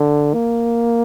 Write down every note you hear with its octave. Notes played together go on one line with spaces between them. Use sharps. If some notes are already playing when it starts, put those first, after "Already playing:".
Already playing: D3
A#3